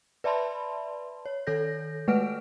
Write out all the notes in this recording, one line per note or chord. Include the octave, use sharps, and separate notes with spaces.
B4 D5 E5 A5 B5 C6
C#5
D#3 A4 C#5 G6 A#6
G#3 A3 B4 F#5 F6 D7